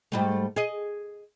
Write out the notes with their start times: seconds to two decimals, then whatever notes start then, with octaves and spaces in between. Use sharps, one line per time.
0.12 G#2 G3 A3
0.56 G#4 D#5